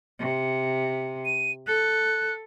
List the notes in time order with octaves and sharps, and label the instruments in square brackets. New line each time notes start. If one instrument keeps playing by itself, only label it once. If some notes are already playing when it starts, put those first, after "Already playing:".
[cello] C3
[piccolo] D#7
[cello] A4 [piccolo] F#6